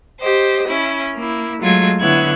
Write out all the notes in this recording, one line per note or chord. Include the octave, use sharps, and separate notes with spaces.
G4 C5 D#5
C#4 E4
A#3 E4
F#3 G#3 A3 F4 G#6
D3 B3 E4 C#5 F#6 G#6